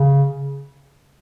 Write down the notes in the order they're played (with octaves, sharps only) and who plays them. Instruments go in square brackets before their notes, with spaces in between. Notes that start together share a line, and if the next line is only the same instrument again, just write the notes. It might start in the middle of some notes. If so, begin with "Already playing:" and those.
Already playing: [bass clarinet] C#3